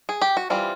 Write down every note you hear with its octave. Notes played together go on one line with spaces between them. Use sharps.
G#4
G4
F#4
E3 G3 C4 F4